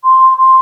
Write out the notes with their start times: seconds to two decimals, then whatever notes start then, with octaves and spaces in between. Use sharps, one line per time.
0.03 C6
0.37 C6